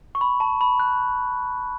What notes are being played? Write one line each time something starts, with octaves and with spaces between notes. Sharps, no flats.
C#6
B5
A5
B5
F#6